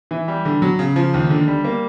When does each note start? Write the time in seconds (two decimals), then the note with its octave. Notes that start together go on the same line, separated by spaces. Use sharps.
0.11 E3
0.28 G3
0.45 D3
0.62 F#3
0.79 C#3
0.96 F3
1.14 D#2
1.30 D3
1.48 G3
1.64 A#3